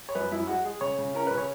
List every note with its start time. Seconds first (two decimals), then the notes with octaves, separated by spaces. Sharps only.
0.09 C#5
0.15 F#2 B4
0.32 F#2 E4
0.48 G#3 F#4
0.64 G#3 G#4
0.81 C#3 C#5
0.98 C#3
1.14 C#4 A#4
1.27 C#3 B4
1.38 C#5